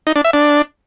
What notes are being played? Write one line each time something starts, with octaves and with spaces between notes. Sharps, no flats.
D#4
D4
E5
D4